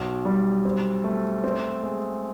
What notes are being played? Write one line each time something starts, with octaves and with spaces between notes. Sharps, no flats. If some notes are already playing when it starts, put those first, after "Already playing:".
Already playing: B1
G3
C4
A3
C4
G#3